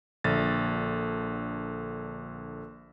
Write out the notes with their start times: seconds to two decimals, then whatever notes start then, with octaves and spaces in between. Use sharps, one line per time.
0.24 A#1 D3 A6